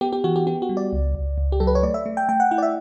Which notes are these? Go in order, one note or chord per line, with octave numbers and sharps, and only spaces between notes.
B3 G4
G4
E3 F#4
G4
B3 G4
F#4
G3
D5
C#2
C#2
C#2
G4
F#3 A4
B4
C#5
A3 D5
E5
A3
G5
A3 G5
F#5
E4 F#5
D5
E5